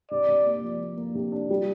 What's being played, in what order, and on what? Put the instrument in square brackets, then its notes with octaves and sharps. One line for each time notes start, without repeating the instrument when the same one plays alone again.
[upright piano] C3 [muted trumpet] D5
[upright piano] C3
A#3
F3
A#3
A#3
C3
D4
G3